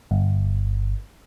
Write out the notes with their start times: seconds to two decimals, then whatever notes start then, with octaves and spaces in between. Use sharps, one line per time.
0.11 G1